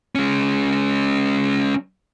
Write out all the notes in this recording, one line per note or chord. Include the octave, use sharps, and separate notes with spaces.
G#3 C#4